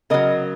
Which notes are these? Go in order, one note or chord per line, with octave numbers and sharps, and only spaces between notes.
C#3 F#3 A#4 D#5